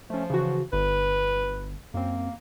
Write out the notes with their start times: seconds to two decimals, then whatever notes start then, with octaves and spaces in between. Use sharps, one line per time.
0.10 F3 A3 C#4
0.30 C#3 E3 F#4
0.73 G1 B4
1.94 F#2 A#3 C4